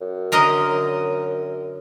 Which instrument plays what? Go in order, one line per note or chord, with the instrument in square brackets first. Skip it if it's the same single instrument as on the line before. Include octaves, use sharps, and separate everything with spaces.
[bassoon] F#2
[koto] D3 A#4 D#5